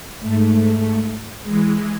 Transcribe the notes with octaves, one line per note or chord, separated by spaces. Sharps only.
G#2 A3
E3 G#3